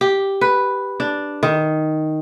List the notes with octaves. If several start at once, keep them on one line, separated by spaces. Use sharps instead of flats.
G4
B4
D4
D#3